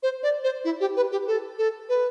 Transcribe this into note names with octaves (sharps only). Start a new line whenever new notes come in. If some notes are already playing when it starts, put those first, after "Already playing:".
C5
D5
C5
E4
G4
B4
G4
A4
A4
B4